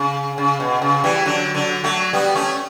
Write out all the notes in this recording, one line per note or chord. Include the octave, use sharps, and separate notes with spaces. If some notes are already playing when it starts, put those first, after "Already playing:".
Already playing: C#3
C#3
B2
C#3
E3 G3
D3 F#3
D3 F#3
F#3 A3
G3 B3
A3 C#4